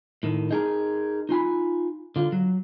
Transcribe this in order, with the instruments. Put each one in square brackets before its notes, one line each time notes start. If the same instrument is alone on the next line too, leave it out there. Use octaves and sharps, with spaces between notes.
[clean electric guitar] A2 D#3
D#4 G#4 A#4
D#4 F4 G#5 B5
D3 F4
F#3